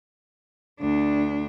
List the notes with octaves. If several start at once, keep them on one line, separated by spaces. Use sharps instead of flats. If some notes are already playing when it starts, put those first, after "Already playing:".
D2 D4